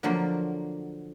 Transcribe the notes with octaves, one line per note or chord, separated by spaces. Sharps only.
D3 F3 F#3 A#3 A#4 C5